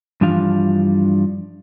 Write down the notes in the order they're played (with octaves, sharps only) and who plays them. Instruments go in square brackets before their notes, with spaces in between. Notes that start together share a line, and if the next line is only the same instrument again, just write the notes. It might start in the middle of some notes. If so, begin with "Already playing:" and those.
[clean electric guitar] G2 E3 F3 G3 D4 F5